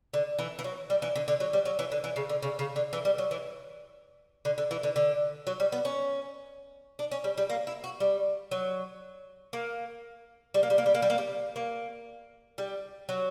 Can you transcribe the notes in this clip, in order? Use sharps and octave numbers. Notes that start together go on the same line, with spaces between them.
D3
E3
E3
F#3
G3
E3
D3
D3
F#3
G3
F#3
E3
D3
E3
C#3
D3
C#3
C#3
D3
E3
G3
F#3
E3
D3
D3
E3
D3
D3
F#3
G3
B3
C#4
D4
C#4
G3
G3
A#3
E4
F#4
G3
F#3
A#3
G3
A#3
G3
A#3
G3
A#3
G3
A#3
G3
A#3
G3
F#3